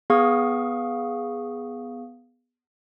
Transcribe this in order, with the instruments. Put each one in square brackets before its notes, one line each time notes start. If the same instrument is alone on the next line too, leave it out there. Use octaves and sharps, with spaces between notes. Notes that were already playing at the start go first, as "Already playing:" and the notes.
[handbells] B3 G#4 F5 C#6 D#6